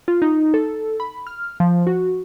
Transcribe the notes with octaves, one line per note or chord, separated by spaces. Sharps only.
F4
D#4
A4
B5
F6
F3
F#4